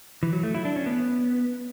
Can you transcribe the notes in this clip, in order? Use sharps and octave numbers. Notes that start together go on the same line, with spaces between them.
E3
F#3
A3
E4
D4
C#4
B3